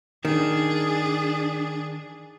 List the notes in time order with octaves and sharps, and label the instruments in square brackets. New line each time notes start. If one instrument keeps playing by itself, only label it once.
[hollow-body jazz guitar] D#3 [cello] D4 G#4